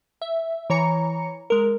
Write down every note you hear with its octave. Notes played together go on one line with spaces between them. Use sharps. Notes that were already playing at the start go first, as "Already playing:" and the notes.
E5
E3 C#5 A#5 C#7
G#3 A#4